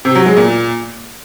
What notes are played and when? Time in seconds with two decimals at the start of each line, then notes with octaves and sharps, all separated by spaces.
0.05 C3
0.15 F#3
0.26 G#3
0.36 A#2